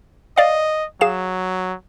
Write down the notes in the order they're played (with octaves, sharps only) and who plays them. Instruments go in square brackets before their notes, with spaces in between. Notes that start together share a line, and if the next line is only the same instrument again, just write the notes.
[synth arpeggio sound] D5 F5 [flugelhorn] D#5
[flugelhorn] F#3 [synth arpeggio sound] G#4 F5 E7